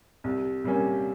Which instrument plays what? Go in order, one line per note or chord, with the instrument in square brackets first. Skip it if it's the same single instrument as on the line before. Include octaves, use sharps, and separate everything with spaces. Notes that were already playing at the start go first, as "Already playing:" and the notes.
[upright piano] C2
C3 G3 A#3 C#4